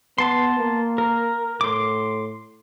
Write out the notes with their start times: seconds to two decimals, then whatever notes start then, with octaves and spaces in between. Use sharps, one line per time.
0.18 B3 A5 C6
0.59 A#3
0.98 A#4
1.61 A2 C6 D6